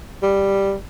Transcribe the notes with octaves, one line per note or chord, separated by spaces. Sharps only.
G3